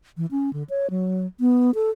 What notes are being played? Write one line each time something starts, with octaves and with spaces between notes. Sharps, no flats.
E3
C#4
D3
C#5
F#3
B3
A4